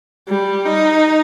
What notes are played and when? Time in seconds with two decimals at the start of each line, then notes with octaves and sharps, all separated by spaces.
0.28 G3
0.65 D#4